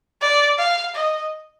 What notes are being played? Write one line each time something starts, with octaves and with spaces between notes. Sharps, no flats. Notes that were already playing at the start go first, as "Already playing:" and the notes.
D5
F5
D#5